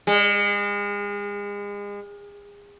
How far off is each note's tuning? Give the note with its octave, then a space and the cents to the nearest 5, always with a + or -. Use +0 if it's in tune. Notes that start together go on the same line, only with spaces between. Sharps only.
G#3 -35